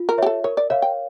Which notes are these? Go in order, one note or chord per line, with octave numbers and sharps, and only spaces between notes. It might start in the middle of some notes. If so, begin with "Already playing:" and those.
Already playing: F4
A#4
G4 C#5 E5
A4
A#4 C#5
D5
C#5 E5 F5
G5